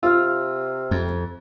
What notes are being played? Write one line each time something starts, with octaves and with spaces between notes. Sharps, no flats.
C3 F4 E6 F6
F2